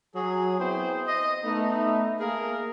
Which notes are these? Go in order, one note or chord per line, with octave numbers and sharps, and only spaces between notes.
F#3 G#4
B3 C4 E4 G#4 C5 G5
D#5
A3 B3 D#4
A#3 G#4 A#4